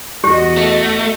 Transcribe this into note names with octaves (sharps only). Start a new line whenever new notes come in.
E2 F#4 G4 D#5
A3